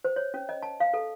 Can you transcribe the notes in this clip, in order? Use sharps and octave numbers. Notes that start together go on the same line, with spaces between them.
C5
C#5
C#4
D#5
A5
F5
A4